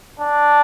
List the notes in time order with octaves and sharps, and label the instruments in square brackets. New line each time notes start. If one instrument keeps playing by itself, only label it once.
[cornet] D4